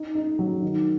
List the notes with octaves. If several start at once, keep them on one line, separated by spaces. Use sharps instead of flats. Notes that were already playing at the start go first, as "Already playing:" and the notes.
Already playing: D#4
D#4
F#3
D#3